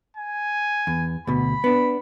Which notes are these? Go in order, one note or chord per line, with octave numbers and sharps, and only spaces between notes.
G#5
E2
D2 B2 B5
B3 D4